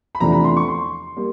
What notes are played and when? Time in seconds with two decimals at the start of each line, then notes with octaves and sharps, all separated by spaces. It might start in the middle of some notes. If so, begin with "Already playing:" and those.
0.15 B5
0.20 E2 C3 F3 A3 D4 A#5
0.32 B5
0.44 C6
0.57 C#6
0.68 C6
1.16 G3 A#3